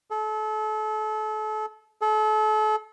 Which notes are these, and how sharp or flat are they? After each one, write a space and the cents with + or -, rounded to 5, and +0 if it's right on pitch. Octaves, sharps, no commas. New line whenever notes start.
A4 -35
A4 -35